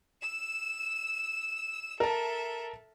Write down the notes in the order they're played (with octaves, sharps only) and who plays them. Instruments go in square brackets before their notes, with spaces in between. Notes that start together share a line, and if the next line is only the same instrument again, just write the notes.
[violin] E6 E7
[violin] A4 E5 [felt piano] A#4 A5